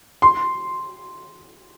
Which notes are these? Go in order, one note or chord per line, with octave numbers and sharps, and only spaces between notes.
C6